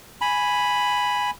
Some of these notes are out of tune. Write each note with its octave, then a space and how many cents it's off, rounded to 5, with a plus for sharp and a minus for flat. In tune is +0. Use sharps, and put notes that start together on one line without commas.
G#5 +0 B5 +0